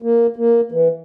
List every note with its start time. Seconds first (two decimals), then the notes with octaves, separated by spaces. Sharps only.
0.02 A#3
0.36 A#3
0.72 E3